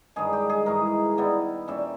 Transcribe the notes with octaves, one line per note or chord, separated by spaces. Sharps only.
G2 D#3 G#3 G#4
G4
G#4
G#2 E3 G#3 A#4
D#3 G3 B3 E4
A#2 G3 C#4 E5